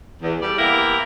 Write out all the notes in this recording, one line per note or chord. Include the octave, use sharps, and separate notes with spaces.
E2
G3 G4 A4 D5
A#3 B3 E4 G4 A#4